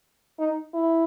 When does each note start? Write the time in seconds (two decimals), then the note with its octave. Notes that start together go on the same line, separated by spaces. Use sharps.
0.39 D#4
0.74 E4